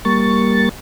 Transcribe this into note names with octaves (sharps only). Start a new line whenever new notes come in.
G3 A#3 C#6 A6